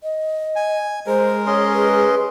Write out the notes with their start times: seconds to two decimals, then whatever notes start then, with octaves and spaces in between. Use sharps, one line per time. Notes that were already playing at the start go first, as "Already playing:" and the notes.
0.03 D#5
0.56 G#5
1.07 G#3 G#4 A#4 C5
1.46 C#4 C#5 D#5 C6
1.73 B4